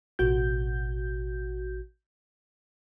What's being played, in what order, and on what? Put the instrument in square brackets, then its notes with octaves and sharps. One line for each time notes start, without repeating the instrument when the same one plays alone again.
[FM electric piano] A1 B2 F#4 G6